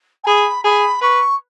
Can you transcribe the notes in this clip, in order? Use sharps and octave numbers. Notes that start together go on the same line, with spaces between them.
G#5
G#4 B5
G#4 B5
B4 C#6